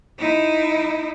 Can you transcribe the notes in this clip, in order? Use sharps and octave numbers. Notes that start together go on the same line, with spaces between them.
D#4 E4